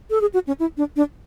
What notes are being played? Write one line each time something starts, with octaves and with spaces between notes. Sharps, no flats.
A4
G#4
F#4
C#4
E4
D4
D4